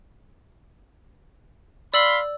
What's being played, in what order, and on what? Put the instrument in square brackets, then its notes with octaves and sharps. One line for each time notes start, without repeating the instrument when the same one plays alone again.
[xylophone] D5 E6 F#7 [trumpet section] F5 B5 C6